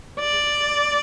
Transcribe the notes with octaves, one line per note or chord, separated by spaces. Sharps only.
D5